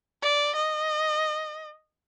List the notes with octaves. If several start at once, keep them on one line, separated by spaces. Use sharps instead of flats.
D5
D#5